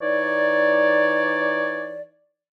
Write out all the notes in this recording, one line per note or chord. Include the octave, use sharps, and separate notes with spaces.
E3 D#4 C#5 D5